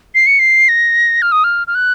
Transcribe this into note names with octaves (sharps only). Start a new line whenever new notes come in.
C7
C#7
C7
A#6
F6
D#6
F6
F6
F#6